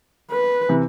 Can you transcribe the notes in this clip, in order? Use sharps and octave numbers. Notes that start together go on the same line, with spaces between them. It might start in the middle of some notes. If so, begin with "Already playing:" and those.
B4
C3 E3